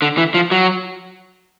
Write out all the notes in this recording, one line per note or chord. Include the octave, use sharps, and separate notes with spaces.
D3
E3
F3
F#3